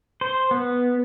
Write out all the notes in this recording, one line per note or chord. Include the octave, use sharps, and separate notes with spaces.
C5
B3